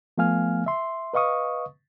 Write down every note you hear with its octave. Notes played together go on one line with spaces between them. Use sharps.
F3 A3 B3 F5 G#5 F6
E5 C6
B4 D#5 F5 C#6 D#6